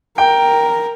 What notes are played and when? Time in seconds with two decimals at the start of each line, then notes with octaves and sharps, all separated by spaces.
0.18 A#4 G5